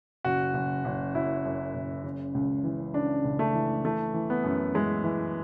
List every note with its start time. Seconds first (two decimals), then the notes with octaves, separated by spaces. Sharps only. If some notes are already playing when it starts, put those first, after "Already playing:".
0.24 F#1 F#4
0.54 F#1
0.85 F#1
1.15 F#2 E4
1.45 F#2
1.75 F#1
2.04 C#3
2.34 C#2
2.64 E3
2.94 C#3 D4
3.24 C#2
3.39 A3
3.54 E3
3.84 E3 A3
4.14 E3
4.30 B3
4.44 F#2
4.74 E3 G#3
5.04 E3